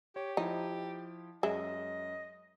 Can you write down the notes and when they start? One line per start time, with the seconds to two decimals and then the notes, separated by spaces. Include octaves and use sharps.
0.16 G4 C#5
0.37 F3 D#4 E4
1.43 F#2 G#3 D#5 E5